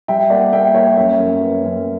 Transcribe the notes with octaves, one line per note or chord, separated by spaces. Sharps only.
G3 E5 G5
A#3 D5 F#5
A#3 E5 G5
A#3 C#5 E5
F#2 C#5 E5
F#2
B3
F#2